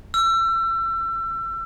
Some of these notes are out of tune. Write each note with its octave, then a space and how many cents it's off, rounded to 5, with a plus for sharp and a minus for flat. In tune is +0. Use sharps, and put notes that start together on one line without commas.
E6 +35